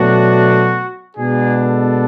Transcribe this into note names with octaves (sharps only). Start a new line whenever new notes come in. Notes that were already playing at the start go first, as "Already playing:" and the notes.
Already playing: B2 F#3 A3 D4 F#4
B2 G#3 B3 D4 G#4
A4